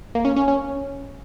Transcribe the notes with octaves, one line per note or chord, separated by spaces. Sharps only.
A#3
C#4
C#4
C#4